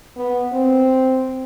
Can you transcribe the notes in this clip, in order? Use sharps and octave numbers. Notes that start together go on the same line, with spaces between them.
B3
C4